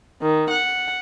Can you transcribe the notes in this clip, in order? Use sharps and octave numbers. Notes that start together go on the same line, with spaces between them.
D#3
F#5